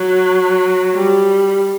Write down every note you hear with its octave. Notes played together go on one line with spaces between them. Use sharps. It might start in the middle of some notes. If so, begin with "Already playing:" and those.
Already playing: F#3
G3